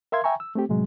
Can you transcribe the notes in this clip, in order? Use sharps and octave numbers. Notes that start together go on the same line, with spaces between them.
A#4 E5 F5 C6 G#6
E5 G5 G#5 A#5 C#6
E6
A3 C4 G4
A2 C3 F#3 G#3